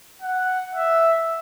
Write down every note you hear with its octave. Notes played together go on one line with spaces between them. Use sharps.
F#5
E5